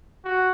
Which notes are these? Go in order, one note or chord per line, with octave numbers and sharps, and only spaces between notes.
F#4